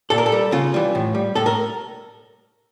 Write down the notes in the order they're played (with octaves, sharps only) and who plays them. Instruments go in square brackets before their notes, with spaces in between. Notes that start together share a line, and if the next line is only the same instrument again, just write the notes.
[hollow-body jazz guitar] A#2 A4
A#4
A4
G3
C#3 F4
E3 G3
A2
G3
A2 A4
A#4